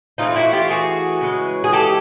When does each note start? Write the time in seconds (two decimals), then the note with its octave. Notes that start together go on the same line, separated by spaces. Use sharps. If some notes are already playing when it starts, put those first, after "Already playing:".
0.18 E3 A3 C4 D#4 F4
0.36 E4 F#4
0.53 F4 G4
0.70 F#4 G#4
1.21 C#3 E3 G#3
1.64 G#4
1.73 G4 A4